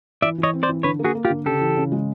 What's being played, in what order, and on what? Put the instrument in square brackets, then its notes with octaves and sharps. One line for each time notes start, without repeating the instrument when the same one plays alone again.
[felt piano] E3 [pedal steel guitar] D5 E5
[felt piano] E3
[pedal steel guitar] C#5 D#5
[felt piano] C4
[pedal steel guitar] C5 D5
[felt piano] E3
[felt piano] D3 [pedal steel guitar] B4 C#5
[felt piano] A#3
[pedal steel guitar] F#4 G#4
[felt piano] A#3
[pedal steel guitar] F4 G4
[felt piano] D3
[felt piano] C#3 [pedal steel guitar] G4 A4
[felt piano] E3
C#3
G#3